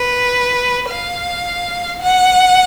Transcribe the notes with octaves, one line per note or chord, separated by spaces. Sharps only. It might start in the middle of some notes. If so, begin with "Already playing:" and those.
Already playing: B4
F5
F#5